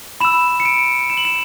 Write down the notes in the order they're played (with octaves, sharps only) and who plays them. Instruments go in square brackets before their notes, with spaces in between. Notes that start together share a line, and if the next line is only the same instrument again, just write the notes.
[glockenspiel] B5 E6 E7
C#7
D7
E7
F#7
E7